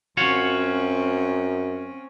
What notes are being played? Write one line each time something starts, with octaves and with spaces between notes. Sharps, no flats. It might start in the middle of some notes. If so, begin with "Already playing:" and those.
F#2 C4 C#4 F4 F#4 C#5